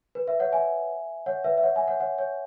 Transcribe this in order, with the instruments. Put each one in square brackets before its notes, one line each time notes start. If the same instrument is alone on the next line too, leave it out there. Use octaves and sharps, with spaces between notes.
[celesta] B4
B4 E5
C#5 F#5
E5 G#5
C#5 F#5
B4 E5
E5
C#5 F#5
E5 G#5
C#5 F#5
C#5 F#5
C#5